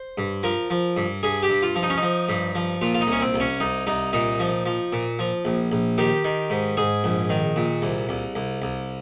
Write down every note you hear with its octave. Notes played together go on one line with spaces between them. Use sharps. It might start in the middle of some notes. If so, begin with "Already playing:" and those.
Already playing: C5
G2
F3 A#4
F3
G2
G2 G#4
G4
G2
F4
F3
D#4
C#4
D#4
F3
G2
F3
A#2 F4
F4
D#4
C2 C#4
C4
C2
C#4
C2 D#4
C2 D#4
A#2 D#4
F3
F3
A#2
F3
A#1
A#1
D#3 G4
D#3
G#2
G#2 G#4
A#1
D#3
A#2
C2
C2
C2
C2